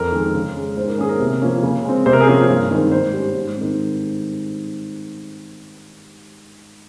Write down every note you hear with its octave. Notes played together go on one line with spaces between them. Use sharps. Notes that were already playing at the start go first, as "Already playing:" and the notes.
Already playing: F2 A#4
D#3 G#3
C#3
G#3 C#4
G#2 C5
A#4
D#3 A#3 C#4 G#4
A#4
C3
F3 A#3 C#4
C#3
G#3 C4
C3 C5
A#4
G#4
F3 A#3 C#4 A#4
G2
D#3 G#3 C4
G#2 C5
G3 C#4
G#2
D#3 G#3 C4